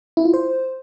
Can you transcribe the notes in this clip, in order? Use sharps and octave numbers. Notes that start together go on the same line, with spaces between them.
E4
F4
C5